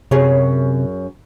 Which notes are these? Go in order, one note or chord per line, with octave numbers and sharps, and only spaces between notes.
F#2 C3 G#4 C#5